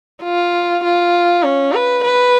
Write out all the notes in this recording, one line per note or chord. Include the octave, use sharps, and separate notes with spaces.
F4
F4
C#4
B4
B4